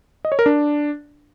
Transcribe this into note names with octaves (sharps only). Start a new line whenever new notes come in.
D#5
C#5
A#4
D4